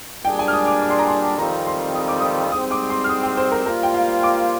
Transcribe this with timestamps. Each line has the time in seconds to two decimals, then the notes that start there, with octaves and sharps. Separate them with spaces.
0.24 A#2 G3 D4 G#4 G5
0.39 G#5
0.48 F6
0.53 D#6
0.67 D6
0.81 D6
0.90 C6
0.99 A#5
1.07 C6
1.38 F2 D#3 G3 C4 F4 A#5
1.66 C6
1.95 D#6
2.08 D6
2.21 D#6
2.52 G#2 G3 C4 D#6
2.71 D6
2.90 C6
3.04 F6
3.09 D#6
3.23 G5
3.37 C5
3.52 A#4
3.65 G3 A#3 F4 A#4 C5
3.83 G5
3.94 F5
4.23 D6